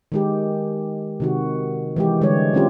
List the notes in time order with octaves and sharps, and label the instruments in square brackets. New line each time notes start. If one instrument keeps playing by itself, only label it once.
[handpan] D#3 G#3 G4
C3 D#3 F#4
E3 G#3 G4
D3 G3 G#3 C#5
F#3 G#3 C4 C#4 F4 G4